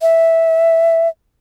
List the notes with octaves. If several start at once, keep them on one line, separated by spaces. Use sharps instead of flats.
E5